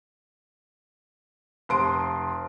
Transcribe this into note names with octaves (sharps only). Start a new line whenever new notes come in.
F1 C6 D7